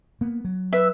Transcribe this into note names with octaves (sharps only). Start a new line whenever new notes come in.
A#3 B3
F#3
B4 E5